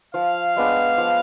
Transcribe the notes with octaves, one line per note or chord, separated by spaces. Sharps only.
F3 F5
G#3 B3 D4
F3